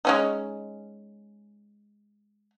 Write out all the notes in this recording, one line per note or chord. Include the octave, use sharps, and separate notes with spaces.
G#3 C#4 D#4